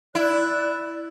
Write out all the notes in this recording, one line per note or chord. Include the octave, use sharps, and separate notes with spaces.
E4 D5 F#6